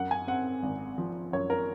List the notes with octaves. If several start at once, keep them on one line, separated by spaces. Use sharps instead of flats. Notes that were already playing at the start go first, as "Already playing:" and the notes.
Already playing: F#2 F#5
G#5
C4 F#5
G#1
F3
F#2 C#5
A#4